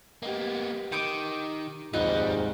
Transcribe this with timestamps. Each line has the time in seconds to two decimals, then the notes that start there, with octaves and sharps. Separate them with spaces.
0.23 A#3 B3 G4 D#5
0.92 D#3 D#4 D6 D#6
1.94 F1 D#2 G#2 G3 F4 D#5 F#5